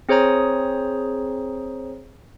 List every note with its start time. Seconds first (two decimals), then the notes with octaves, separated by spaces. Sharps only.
0.09 C4 G#4 C5 C#5 A#5 D#6